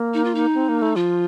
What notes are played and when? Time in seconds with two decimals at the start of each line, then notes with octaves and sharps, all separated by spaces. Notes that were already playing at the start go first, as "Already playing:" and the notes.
Already playing: A#3
0.14 D#4
0.24 F4
0.35 D#4
0.54 C4
0.69 A#3
0.82 A3
0.96 F3 F4